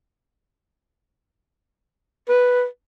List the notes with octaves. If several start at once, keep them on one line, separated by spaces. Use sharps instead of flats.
B4